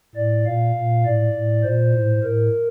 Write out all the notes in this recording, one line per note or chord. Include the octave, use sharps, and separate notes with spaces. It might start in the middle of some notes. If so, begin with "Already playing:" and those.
A2 D5
A#2 F5
A#2
A2 D5
A2
A#2 C5
A2
A2 A#4